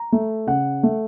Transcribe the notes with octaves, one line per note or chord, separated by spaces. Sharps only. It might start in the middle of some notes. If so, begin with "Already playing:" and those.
Already playing: A#5
A3
C#3 F#5
A3